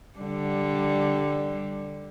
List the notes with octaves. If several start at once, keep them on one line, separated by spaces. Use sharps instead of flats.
D3 G3